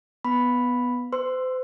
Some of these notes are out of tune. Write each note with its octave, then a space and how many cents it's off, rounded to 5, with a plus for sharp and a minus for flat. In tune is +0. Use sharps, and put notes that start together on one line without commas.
B3 +0 B5 +0
C5 -35 C6 +0 E6 +15